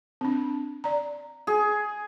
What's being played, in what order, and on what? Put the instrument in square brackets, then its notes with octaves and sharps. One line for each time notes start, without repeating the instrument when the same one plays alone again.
[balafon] C4 D4
D5 A#5
[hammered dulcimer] G#4